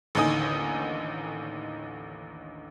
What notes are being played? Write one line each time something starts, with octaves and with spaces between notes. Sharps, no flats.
A1 D#2 D3 D#4 G#5 D#6